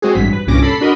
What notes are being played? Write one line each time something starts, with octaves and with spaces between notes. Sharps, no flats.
G#3 C4 F#4 G#4
A1 G2 B6
B4
C2 G2 A#2 C#4 D6 A#6
A4 B5 C7
D4 F#4 A#4 D#5 B5